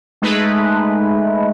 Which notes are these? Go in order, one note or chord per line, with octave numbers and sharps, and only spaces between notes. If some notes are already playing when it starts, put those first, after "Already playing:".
G#3 A3 D#4 B4